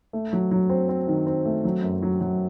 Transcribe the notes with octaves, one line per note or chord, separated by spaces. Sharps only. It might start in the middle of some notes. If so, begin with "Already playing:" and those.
A3
F#3
F#3
C4
C4
D#3
C4
A3
F#3
F#2
F#3
F#3